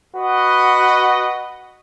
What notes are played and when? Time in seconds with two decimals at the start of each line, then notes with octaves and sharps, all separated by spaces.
0.16 F#4 B4 D#5 F#5